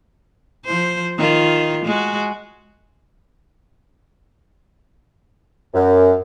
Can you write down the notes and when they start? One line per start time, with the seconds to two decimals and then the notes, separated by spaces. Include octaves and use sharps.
0.65 F3 C5
1.17 D#3 F4
1.85 G#3 F#4
5.73 F#2